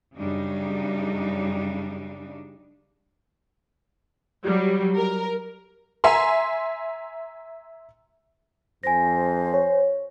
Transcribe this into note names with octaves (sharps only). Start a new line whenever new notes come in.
F#2 C#3 G3 D4 D#4
F#3 G3
A#4
E5 G#5 A#5 C6
F2 C5 G#5 A#6
C#5